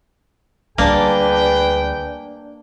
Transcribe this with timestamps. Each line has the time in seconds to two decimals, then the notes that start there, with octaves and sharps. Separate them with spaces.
0.78 D2 G3 A#3 D4 G#4 B4 G5